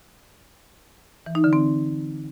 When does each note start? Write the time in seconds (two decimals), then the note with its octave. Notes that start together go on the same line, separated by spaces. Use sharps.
1.26 E3
1.35 D#4
1.44 D3
1.53 C4